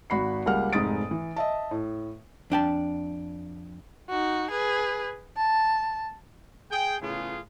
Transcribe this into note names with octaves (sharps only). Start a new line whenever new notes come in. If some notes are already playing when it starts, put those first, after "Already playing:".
G#1 F#4 B5 C7
C#2 G3 A#3 F#5 F6
F1 G#2 C3 D#6 A6 D7
E3
D#5 E5 A5
A2
F2 D4 G5 A5
D#4 F#4
G#4 B4
A5
G#4 G5
A2 C#3 B3 F4 G#4